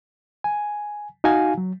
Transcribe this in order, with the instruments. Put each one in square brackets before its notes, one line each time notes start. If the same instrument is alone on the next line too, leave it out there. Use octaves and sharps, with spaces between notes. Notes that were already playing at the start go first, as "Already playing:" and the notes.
[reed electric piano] G#5
D#4 F#4 F5 G#5
F#3